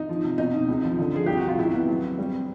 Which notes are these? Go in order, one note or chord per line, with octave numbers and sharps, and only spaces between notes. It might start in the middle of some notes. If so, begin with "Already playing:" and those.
Already playing: D#4
F3
C3
B2 D#4
B2
C#2
F3
D3
F3 G#4
C2 G4
F#4
C3 F4
C#2 E4
B3
F#3
C4
G3
C4